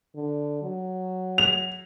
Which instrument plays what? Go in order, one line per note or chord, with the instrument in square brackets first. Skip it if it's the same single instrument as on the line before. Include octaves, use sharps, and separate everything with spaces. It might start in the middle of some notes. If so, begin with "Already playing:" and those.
[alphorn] D3
F#3
[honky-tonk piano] F7